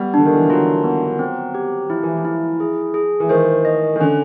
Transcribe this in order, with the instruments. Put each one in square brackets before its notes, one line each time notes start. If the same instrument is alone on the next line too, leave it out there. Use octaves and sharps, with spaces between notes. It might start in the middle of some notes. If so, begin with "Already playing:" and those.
Already playing: [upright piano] G3 [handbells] B3
[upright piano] D3 [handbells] D4
[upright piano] D#3
E3
F3
[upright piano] F#3 [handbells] F4
[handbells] B3
C4
G4
[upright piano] F3 [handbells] E4
[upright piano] E3
F3
[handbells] E4
G#4
G#4
[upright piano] E3
[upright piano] D#3 [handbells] C5
[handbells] D#5
[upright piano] D#3
[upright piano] D3 [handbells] C#4